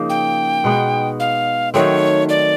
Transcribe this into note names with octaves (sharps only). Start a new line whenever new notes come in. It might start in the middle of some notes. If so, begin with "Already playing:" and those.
Already playing: C#3 F3 A#3 D#4
G5
B2 G#3 B3 D#4
F5
D#3 F#3 A3 C4 C#5
D5